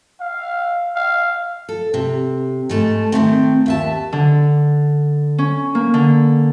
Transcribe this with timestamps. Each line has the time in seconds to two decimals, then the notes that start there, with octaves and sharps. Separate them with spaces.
0.20 F5
0.96 F5
1.69 A4
1.94 C3
2.70 G#2 A3 A5
3.12 D#3 F3 A3 C4
3.66 D#2 E5 A5
4.13 D3
5.38 C#4
5.75 A#3
5.94 D3